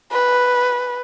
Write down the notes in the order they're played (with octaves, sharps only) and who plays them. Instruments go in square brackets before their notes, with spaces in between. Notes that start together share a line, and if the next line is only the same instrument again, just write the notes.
[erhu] B4